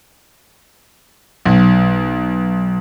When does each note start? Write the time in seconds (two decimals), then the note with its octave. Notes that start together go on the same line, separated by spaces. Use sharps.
1.45 B1